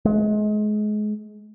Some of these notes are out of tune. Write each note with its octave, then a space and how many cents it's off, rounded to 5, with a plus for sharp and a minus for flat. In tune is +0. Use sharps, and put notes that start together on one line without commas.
G#3 +30